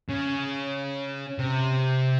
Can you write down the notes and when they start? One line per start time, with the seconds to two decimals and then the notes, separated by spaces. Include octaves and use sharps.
0.10 C#3
1.38 C3